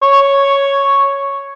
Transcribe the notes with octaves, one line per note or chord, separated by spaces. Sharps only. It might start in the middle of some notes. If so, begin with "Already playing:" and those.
C#5